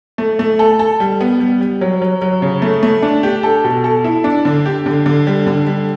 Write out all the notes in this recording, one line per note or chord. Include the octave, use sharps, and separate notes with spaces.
A3
A3
A4
A4
G3
B3
G3
G3
F#3
F#3
F#3
C#3
A3
A3
D4
G4
A4
B2
A4
E4
D4
D3
G4
D3
D3
G3
D3
G3